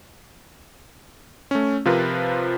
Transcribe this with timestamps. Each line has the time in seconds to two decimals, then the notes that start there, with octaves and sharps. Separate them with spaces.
1.51 A3 C#4
1.85 C3 F3 F4 A#4 B4